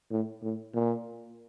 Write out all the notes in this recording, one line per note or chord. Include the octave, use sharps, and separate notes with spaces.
A2
A2
A#2